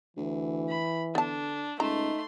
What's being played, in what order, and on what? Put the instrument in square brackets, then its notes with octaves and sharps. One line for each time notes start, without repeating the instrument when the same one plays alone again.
[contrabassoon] D2 [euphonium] E3
[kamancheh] B5
[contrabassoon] D3 [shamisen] B3 A5 [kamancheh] D4
[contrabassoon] C#2 [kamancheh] A3 C6 [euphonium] D#4 [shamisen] A#5